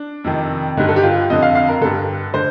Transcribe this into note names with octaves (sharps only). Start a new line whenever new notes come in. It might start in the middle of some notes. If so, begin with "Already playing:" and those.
Already playing: D4
F2 C3 D#3
G2 D3 D#4
A4
G4
F4
F2 D3 D#5
F5
F5
A#4
G2 D3 A4
D3 C5